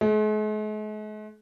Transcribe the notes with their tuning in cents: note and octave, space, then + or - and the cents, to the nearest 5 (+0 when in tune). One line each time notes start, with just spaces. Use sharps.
G#3 +45